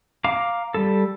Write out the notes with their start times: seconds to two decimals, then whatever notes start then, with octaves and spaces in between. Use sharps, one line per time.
0.24 F5 A#5 D6
0.74 G3 A4